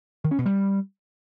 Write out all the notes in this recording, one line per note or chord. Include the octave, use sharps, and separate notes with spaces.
D#3
C#4
B2
G3